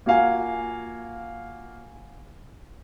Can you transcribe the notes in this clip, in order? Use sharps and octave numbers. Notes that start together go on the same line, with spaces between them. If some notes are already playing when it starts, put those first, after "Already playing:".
A#3 F4 F#4 F5 G#5